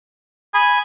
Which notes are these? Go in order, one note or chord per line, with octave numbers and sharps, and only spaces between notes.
G#5 B5